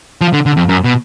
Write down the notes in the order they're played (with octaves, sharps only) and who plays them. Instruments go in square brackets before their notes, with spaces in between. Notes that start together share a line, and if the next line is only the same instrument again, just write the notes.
[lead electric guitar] F3
D3
D3
F2
F#2
B2